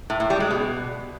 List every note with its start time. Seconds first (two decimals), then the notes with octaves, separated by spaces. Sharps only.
0.10 A2
0.20 A2
0.30 G3
0.40 G#3
0.51 B2